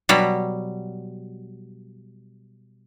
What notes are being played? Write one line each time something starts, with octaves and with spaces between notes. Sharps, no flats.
B2 F#3 G3